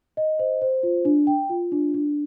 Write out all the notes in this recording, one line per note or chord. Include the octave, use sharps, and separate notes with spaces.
D#5
C5
C5
F4
D4
G5
F4
D4
D4